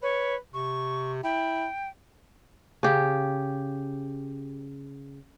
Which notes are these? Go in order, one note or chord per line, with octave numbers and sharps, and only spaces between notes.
B4 C#5
C3 C#6
E4 G5
C#3 G4